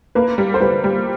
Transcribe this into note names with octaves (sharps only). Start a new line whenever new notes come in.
A#3 B4
G3
C5
G3 B4
G3